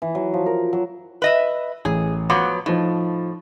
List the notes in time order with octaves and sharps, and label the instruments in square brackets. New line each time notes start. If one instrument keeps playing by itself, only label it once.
[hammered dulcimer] E3
F#3
F3
A#4
F#3
[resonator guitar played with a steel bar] B4 D#5 E5
[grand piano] A1 [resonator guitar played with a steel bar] G#4
[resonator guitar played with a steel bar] F3 F#3 B3 [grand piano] D6
[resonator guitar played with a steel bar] A2 [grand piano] F3 D#4